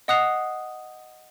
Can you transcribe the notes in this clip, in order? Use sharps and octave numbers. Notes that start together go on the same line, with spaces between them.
D#5 F#5 D#6 F#6 C7 F7